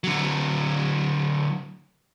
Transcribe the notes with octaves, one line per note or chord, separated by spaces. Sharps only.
D3 F#3